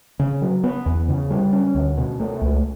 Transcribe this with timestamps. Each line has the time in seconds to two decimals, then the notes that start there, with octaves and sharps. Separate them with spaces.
0.19 C#3
0.42 F#3
0.64 B3
0.86 E2
1.08 C#3
1.30 G3
1.53 C#4
1.75 D2
1.97 B2
2.20 A3
2.41 C#2